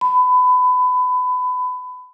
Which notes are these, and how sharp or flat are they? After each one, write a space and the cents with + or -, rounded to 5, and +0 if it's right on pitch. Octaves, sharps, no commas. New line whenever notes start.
B5 +25